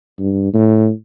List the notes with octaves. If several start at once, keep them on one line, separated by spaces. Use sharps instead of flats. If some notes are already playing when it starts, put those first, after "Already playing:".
G2
A2